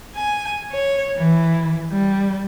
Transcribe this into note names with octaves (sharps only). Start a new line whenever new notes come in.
G#5
C#5
E3
G3